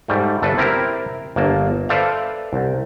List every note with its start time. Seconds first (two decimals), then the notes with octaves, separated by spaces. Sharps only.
0.08 G#2 G3 A3
0.42 G1 D4 A4 B4 A5
0.57 C4 E4 G4 A#4 C5
1.36 G1 A#3 A5
1.89 A4 B4 C5 D5 E5 F5
2.53 C2